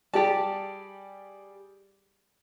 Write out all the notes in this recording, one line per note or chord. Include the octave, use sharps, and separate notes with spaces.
G3 G4 G#4 D5 A5